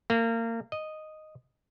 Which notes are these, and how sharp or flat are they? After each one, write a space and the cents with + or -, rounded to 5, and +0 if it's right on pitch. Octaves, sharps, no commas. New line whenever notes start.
A#3 -30
D#5 -5